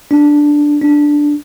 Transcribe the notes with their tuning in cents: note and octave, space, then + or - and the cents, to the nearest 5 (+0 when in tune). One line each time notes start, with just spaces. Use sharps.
D4 +0
D4 +0